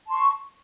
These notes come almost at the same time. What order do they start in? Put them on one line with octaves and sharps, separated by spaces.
A5 C6 C#6